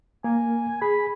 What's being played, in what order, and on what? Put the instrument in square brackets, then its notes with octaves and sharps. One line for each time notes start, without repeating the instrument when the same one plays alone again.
[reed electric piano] A#3 A#4 [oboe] G#5
[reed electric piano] G#4 [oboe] B5